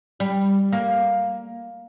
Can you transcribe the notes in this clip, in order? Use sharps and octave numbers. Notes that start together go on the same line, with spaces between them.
G3
A#3